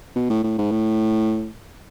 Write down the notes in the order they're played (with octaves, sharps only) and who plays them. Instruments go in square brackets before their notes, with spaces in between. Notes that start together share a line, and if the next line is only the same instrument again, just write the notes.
[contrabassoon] B2
A2
A2
G#2
A2